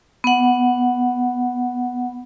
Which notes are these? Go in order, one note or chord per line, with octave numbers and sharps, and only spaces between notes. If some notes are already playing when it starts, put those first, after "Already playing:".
B3 F#5